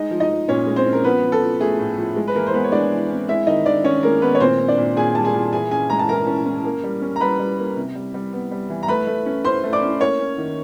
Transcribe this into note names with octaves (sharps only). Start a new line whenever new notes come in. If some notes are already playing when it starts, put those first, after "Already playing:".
Already playing: G#3 D#4 D#5
F3
D#4 D#5
F3
A#2 C#4 C#5
G#3
C4 C5
C#4
A#4
F3 B3 B4
F3
A4
F3
A3 G#4
A2
F3
G#3
B4
E3 A#3 A#4
C5
G#3 B3 B4
C#5
G#3 D4 D5
E3
C4
G#3 E4 E5
D#3 D#4 D#5
D#3 D4 D5
D#3 C#4 C#5
G#3 A#3 A#4
D#3 B3 B4
C#5
A#2 C4 C5
C4
D4 D5
A#2
A#2 G#4 G#5
G3 A5
G#4 G#5
A#2
E3 G#4 G#5
C#4 G#4 G#5
G#3 A#5
A5
E3 A#4 A#5
C#4
C#4
A#3
G3
C#4
A#5
G3 B4 B5
G3
A#3
C3
G3
G3
B3
G3
E3
A#5
A3 B4 B5
A3
C#4
C#4 C5 C6
A3
D5 D6
C#4
A#3 C#5 C#6
C#4
D#3